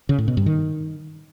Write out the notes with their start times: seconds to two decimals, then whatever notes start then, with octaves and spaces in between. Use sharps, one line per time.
0.09 C#3
0.18 A2
0.28 B2
0.37 G2
0.46 D#3